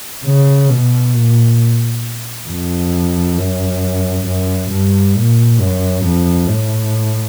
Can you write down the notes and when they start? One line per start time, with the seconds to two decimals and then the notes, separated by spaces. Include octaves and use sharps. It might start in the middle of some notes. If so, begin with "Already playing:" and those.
0.25 C#3
0.70 B2
1.14 A#2
2.48 F2
3.37 F#2
4.26 F#2
4.71 G2
5.16 A#2
5.60 F#2
6.04 F2
6.49 A2